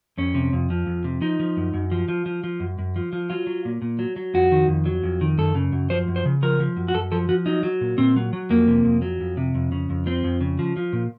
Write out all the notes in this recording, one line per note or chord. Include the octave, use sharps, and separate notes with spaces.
F2 C#4
C3
F2
F3
F2
C3
F3 D#4
F3
F#2
F#2
F3
F3
F3
F3
F#2
F#2
F3
F3
F#3 F4
F#3
A#2
A#2
F#3
F#3
F2 F#4
D#3
F2
F#3
F2
D#3
F#2 A4
C#3
F#2
F3 C5
F#2
C5
C#3
F3 A#4
F3
F#2
F#4
F#2 A4
F3 A4
F3 F#4
F#3 D#4
F#3
A#2
A#2 C4
F#3
F#3
F2 A#3
C3
F2
F#3
F2
C3
F2
C#3
F2
F3 C4
F2
C#3
F3
F3
A#2